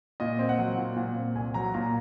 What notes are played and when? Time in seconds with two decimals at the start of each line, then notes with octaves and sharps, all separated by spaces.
0.20 A#2 D#5
0.39 C4
0.49 F#5
0.59 F#3
0.78 A#2
0.97 A#2
1.16 C4
1.35 C2 G#5
1.54 F#3 A#5
1.74 A#2 A#5